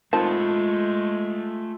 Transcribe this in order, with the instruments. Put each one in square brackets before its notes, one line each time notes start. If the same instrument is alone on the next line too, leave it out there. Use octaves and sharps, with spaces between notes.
[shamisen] D#3 C4 A5 [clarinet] G#3 [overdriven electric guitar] A3 G#4 [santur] F4 B5